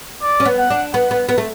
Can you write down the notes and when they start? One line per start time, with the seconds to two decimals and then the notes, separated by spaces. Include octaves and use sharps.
0.22 D5
0.40 C#4
0.45 B3
0.58 F#5
0.70 D4
0.93 B3 F#5
1.11 B3
1.29 B3
1.38 A3